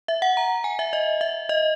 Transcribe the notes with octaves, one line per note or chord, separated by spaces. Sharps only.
E5
F#5
A#5
G#5
E5
D#5
E5
D#5